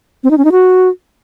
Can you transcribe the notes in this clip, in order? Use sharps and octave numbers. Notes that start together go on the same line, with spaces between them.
C4
D#4
C#4
D#4
F#4